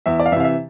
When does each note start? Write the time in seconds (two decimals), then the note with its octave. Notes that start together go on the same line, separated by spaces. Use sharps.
0.06 E2 E5
0.20 D5
0.26 F5
0.32 E3 E5
0.36 C3 F5
0.44 E5